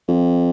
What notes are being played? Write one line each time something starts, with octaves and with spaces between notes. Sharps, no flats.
F2